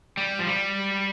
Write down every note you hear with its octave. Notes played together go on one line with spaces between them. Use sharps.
G3
F3
G3